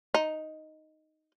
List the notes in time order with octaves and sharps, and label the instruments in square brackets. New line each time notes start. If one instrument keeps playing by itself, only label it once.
[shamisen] D#4